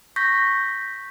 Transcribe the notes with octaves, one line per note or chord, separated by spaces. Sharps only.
C#6 G6 A#6 B6